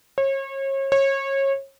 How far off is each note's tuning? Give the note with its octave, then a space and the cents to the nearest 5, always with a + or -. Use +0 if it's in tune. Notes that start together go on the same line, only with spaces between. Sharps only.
C#5 -35
C#5 -25